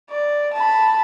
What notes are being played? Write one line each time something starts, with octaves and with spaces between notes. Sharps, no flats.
D5
A5 B5